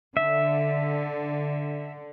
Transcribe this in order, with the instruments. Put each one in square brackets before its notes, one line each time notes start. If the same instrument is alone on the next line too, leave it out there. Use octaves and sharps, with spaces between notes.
[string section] D3 [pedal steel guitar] E5